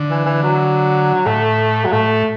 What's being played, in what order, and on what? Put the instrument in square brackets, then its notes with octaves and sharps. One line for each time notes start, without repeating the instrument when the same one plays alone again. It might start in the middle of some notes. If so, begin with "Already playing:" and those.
Already playing: [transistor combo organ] D3
[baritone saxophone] E3
E3
F#3
[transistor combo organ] A2 [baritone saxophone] A3
[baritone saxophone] F#3
[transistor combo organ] A2 [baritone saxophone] A3